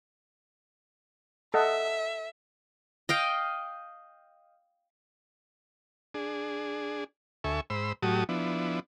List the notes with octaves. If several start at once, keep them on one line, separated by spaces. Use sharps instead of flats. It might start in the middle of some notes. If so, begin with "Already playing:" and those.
A4 D#5 E5 F#5
D#5 F5 G5
D4 G#4
D2 A4 E5 G#5 C#6
G#2 C5 B5 E6
A2 F#3 F#4 G4 A5 D#6
F3 B3 D4 E4